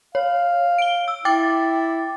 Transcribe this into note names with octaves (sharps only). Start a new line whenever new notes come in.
C#5 F5
D7 G7
E6
E4 G5 D6 A6